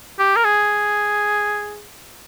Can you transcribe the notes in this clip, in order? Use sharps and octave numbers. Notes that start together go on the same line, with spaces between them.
G4
A#4
G#4